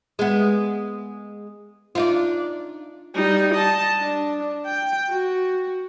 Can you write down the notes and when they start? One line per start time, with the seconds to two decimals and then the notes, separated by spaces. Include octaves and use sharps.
0.19 G#3 B3
1.95 D4 D#4 F4
3.15 G3 D#4
3.54 D#5 A5
3.99 D4
4.66 G5
5.09 F#4